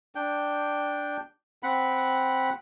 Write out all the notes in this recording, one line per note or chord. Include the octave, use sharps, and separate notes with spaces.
D4 G5
C4 F#5 B5